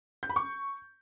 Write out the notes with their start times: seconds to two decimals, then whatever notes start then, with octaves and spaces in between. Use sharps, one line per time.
0.23 G6
0.29 B5
0.36 C#6